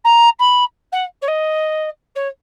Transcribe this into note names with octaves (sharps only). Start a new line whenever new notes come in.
A#5
B5
F#5
C#5
D#5
C#5